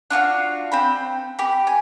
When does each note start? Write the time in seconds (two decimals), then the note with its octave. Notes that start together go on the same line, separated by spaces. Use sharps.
0.10 D4 F4 F#4 F5
0.72 C4 C5 B5
1.39 G4 B5
1.67 G#5